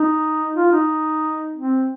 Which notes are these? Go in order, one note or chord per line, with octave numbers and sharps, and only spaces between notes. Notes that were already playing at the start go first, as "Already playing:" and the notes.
Already playing: D#4
F4
D#4
C4